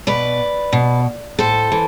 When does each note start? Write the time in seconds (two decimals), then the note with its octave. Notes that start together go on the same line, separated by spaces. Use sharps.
0.07 B2 B4 D5
0.73 B2
1.39 A2 A4 C5
1.72 E3